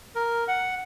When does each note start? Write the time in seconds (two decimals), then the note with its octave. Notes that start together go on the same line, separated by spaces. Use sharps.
0.15 A#4
0.48 F#5